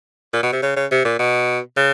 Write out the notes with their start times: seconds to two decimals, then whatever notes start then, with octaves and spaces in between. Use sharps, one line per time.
0.33 A#2
0.43 B2
0.52 C3
0.62 C#3
0.76 C#3
0.91 C3
1.05 A#2
1.19 B2
1.76 C#3